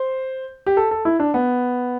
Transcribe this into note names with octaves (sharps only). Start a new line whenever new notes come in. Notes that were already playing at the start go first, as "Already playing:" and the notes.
Already playing: C5
G4
A4
A4
E4
D4
B3